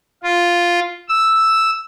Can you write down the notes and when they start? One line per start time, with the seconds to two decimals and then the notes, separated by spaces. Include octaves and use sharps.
0.23 F4
1.09 E6